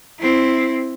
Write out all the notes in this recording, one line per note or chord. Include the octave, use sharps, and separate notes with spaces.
C4 E4